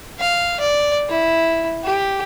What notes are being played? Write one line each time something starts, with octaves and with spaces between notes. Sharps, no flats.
F5
D5
E4
G4